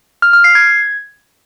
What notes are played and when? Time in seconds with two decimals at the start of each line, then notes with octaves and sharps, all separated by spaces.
0.22 F6
0.33 F6
0.44 C7
0.55 G#6